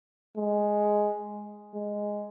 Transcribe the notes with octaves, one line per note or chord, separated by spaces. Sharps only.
G#3
G#3